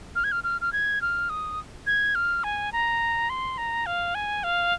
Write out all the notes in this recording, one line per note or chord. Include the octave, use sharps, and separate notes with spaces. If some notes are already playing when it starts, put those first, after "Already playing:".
F6
G#6
F6
F6
F6
G#6
F6
D#6
G#6
F6
G#5
A#5
C6
A#5
F5
G#5
F5